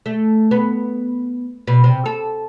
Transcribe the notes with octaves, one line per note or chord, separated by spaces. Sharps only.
A3
B3
B2
C3
A4